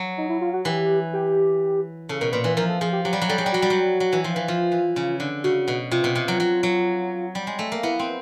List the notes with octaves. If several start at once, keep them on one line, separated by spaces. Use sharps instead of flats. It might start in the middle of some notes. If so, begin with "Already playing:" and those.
Already playing: F#3
D#4
E4
F4
F#4
E3 G4
G4
C#3 A4
B2 A#4
A#2 B4
E3 B4
F3 A#4
A4
F3 G#4
G4
F#3 G4
G3
F#3
G3 A4
F#3 G#4
G3
F#3 F#4
G3
F#3
F#3
E3
F3
E3
F3 F4
E3
C#3
D3
C#3 F#4
B2
C3 F4
B2
C3
F#3
F#3
F#3
G3
G#3
A3
A#3
B3 E4
C4